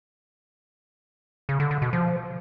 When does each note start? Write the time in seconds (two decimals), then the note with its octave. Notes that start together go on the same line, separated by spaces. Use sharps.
1.49 C#3
1.60 D3
1.71 D3
1.82 B2
1.93 F3